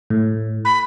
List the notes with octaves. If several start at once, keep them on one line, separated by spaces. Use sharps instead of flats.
A2
B5